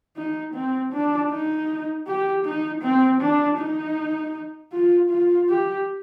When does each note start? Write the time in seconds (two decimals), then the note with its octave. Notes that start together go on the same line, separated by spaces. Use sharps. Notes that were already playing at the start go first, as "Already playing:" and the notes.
0.17 D#4
0.55 C4
0.93 D4
1.31 D#4
2.07 G4
2.45 D#4
2.83 C4
3.21 D4
3.59 D#4
4.73 F4
5.10 F4
5.49 G4